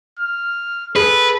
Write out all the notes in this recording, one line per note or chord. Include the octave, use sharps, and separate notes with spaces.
F6
G#4 A4 B4